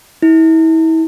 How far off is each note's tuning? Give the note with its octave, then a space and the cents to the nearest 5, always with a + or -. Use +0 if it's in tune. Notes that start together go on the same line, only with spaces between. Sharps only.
E4 -35